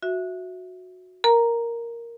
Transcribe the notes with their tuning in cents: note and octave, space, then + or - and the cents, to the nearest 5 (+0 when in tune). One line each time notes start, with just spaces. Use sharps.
F#4 -15 E5 +0
A#4 +0 A#5 +0